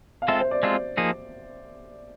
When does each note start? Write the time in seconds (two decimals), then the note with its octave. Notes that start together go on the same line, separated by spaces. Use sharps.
0.22 F5
0.28 G#3 C4 F4 A4 E5
0.40 C5
0.51 D5
0.63 G#3 C4 F4 A4
0.97 F3 A#3 D#4 G#4